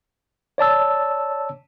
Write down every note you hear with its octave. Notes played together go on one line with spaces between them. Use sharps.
C#5 D5 A5 E6